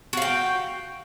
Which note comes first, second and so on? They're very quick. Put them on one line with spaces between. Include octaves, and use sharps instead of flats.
F#4 F5 G5